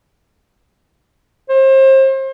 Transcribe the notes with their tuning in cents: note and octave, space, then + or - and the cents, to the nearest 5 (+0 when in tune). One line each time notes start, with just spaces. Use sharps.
C5 +35